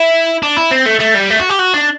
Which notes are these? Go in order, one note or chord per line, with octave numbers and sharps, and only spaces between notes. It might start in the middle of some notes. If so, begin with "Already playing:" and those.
Already playing: E4
D4
E4
C4
A3
A3
G3
A3
F#4
G4
F#4
D4